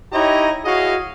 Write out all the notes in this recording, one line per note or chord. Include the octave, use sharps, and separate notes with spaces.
D#4 E4 G4 C#5 D#5 A#5
E4 F#4 G#4 C#5 D#5 F5